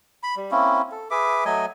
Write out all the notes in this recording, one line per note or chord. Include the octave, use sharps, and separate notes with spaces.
B5
G3
A#3 C4 C#4 E4
A4
G#4 B4 E5 D6
F#3 A3 D#5 G#5